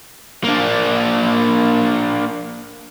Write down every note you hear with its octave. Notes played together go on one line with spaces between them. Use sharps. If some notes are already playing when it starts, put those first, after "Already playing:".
A#3 D4